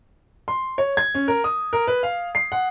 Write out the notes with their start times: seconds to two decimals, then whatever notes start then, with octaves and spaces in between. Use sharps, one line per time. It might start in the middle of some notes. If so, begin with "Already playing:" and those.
0.48 C6
0.78 C#5
0.97 G#6
1.15 C#4
1.28 A#4
1.44 D#6
1.73 A#4
1.87 B4
2.03 F5
2.35 C7
2.52 F#5